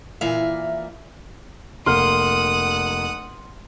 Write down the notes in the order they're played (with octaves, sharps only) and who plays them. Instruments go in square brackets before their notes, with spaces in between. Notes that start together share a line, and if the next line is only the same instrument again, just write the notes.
[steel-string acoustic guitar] A#2 E3 E5 F5
[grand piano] F1 A#3 F6 [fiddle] F#5 D#6 [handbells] C6